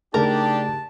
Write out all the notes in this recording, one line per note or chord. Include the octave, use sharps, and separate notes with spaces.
C#3 A3 D4 D#4 G4 G#4 A#4 A5